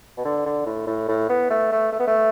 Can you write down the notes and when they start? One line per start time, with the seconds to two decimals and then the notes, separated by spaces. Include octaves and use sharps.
0.17 B2
0.25 D3
0.46 D3
0.66 A2
0.87 A2
1.08 A2
1.29 B3
1.50 A3
1.72 A3
1.92 A3
1.99 B3
2.07 A3